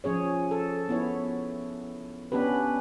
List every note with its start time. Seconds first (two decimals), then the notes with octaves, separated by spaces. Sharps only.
0.04 F3 C#4 G#4 C#5
0.51 A4
0.89 B3 E4 C#5
2.32 B3 C#4 D4 G4 B4